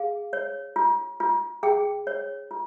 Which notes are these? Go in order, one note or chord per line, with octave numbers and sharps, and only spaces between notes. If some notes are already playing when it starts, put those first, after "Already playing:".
Already playing: G#4 F5
C#5
F4
F4
G#4 G5
C#5
F4